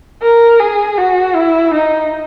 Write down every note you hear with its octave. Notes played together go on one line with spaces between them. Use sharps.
A#4
G#4
F#4
E4
D#4